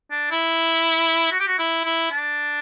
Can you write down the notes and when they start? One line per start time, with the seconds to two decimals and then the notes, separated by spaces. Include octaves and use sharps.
0.11 D4
0.31 E4
1.31 F#4
1.40 G4
1.47 F#4
1.59 E4
1.85 E4
2.12 D4